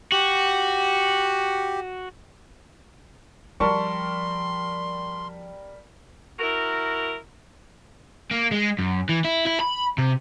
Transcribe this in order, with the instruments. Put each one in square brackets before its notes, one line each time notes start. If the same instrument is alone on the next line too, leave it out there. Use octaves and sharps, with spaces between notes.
[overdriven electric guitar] F#4 [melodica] G4
[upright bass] F3 [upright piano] G3 A#4 A5 [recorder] C6 [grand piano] C#6
[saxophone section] E4 F#4 A#4
[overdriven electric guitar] A#3
G#3
F#2
E3
E4
E4
B5
C3